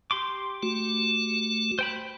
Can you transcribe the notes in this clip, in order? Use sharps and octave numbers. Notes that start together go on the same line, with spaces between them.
G4 C6 D6
A3 F#4
C5 G5 B5